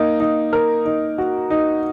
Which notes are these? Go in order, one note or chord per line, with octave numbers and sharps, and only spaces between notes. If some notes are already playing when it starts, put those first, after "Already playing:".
Already playing: A#3 D#4
D#4
A#4
D#4
F#4
D#4